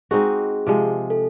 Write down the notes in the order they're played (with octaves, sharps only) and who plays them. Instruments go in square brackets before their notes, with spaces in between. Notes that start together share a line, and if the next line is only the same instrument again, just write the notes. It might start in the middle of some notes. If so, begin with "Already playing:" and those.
[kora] G#3 C4 D#4 F#4 [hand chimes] G#4
[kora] C3 F3 G#3
[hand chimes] A4